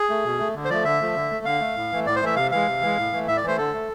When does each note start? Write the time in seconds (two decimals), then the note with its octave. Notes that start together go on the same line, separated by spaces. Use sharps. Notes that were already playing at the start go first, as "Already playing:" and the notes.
Already playing: G#4
0.10 A3
0.25 B2
0.40 A3
0.55 D3
0.65 C5
0.70 F3 A3 D5
0.85 D3 E5
1.01 F3 A3
1.16 D3
1.30 A3
1.45 D3 F5
1.60 A3
1.76 A2
1.92 E3 A3
2.06 A2 D5
2.16 C5
2.22 E3 A3 E5
2.36 C3 F5
2.51 E3 G#3 F5
2.67 C3
2.81 E3 G#3
2.98 A2
3.12 E3 A3
3.27 A2 E5
3.37 D5
3.43 E3 A3 C5
3.57 D3 A4
3.73 A3